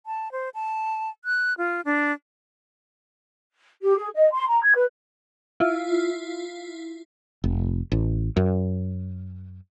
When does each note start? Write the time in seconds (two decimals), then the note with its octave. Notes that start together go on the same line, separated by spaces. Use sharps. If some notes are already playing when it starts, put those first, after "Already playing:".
0.06 A5
0.32 C5
0.54 A5
1.25 F#6
1.58 F4
1.85 D4
3.82 G4
3.96 G#4
4.14 D#5
4.32 C6
4.49 A#5
4.63 G#6
4.75 B4
5.60 E4 F4
7.44 F1
7.92 A1
8.37 F#2